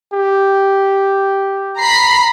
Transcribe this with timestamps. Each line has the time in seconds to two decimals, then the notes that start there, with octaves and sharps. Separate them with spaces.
0.14 G4
1.80 A#5 B5 C7